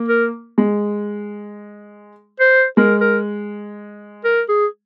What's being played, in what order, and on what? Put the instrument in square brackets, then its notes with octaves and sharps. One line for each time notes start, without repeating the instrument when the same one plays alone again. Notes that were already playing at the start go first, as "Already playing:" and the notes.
Already playing: [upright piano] A#3
[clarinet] A#4
[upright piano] G#3
[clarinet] C5
[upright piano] G#3 [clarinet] A#4
[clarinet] A#4
A#4
G#4